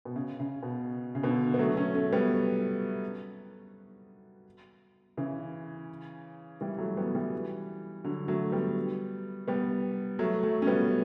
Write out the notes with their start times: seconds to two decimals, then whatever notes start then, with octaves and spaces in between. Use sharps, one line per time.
0.05 B2
0.16 C#3
0.40 C#3
0.63 B2
1.15 C#3
1.23 B2 D3
1.54 B3
1.59 F#3 A3
1.77 A3 C#4
1.95 A3 C#4
2.13 G3 B3
5.17 C#3 E3
6.61 E3 G3
6.78 F#3 A3
6.97 G3 B3
7.15 E3 G3
8.04 D3 F#3
8.28 F#3 A3
8.52 G3 B3
9.48 G3 B3
10.19 F#3 A3
10.43 F#3 A3
10.62 C#4
10.67 G3 B3